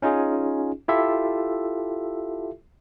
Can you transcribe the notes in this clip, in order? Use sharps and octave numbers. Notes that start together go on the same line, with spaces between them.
C#4 D#4 F4 G#4
E4 F4 G4 A4 E5